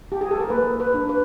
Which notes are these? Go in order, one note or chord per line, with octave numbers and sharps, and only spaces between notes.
G4
G#4
A4
A#4
A#3 B4
B4
D4
B4